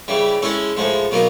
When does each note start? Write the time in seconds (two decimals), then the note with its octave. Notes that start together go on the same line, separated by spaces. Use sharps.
0.08 C#3 E3 G3
0.42 G#3 C#4 E4 A4
0.77 A2 F3 G#3
1.11 B2 F#3 A#3 D#4